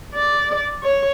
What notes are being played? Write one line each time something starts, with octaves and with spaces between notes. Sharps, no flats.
D5
C#5